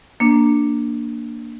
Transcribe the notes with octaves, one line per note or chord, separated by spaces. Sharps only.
A#3 D4